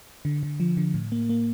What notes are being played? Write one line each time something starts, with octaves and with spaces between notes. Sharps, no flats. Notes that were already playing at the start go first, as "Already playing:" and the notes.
D3
D3
F3
D3
A2
A#3
A#3